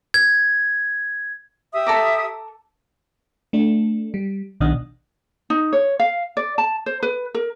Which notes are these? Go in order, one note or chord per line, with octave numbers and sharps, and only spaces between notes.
G#6
G4 E5 D#6
A4 A#5 D6
A3 D4
G3
B1 B2 D#3 D4 D#6 F6
D#4
C#5
F5
D5
A5
C5
B4
A#4